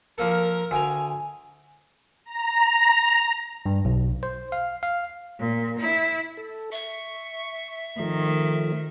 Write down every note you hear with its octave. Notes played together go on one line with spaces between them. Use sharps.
F3 A#3 A4 A#4
D2 G5 G#5 A#5
A#5
G2
B1
C5
F5
F5
A#2
E4
A4
E5 C#6
D#3 F3 A3